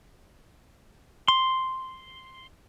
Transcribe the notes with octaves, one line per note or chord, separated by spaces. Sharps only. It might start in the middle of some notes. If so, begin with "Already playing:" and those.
C6